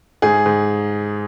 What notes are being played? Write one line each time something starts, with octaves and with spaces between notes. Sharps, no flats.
G#2 G#4
G#2